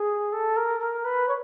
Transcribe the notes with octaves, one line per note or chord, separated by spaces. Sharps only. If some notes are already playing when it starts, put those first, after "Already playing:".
Already playing: G#4
A4
A#4
A#4
B4
C#5